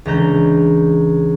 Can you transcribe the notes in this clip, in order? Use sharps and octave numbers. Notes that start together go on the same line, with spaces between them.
C#2 E3 D4 A#5 G6 A#6